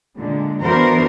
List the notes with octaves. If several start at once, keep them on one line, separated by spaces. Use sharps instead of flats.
A#2 D3 G#3
E3 B3 D4 F#4 A#4 C5